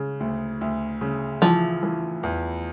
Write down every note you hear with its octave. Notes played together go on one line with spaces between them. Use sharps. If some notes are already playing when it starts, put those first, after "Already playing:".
Already playing: C#3 G#3
D2
D2
C#3
E3 F3
E3
E2